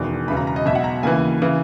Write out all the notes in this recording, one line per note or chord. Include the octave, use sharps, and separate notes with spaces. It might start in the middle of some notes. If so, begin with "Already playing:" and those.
Already playing: E1 E2 D#3
E1 E2 C#3 B5
A#5
A#5
D#5
B1 B2 E5
F#5
A#5
D#2 C#3 E3 G#5
C#3 E3